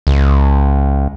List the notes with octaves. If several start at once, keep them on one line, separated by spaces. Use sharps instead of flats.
C#2